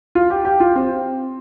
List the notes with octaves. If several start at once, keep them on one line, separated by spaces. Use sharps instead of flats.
F4
G4
G4
F4
C4